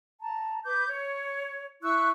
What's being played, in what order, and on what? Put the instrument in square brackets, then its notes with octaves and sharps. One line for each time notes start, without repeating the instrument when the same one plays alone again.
[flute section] A5 A#5
B4 D6 G6
C#5
E4 C#6 E6 F#6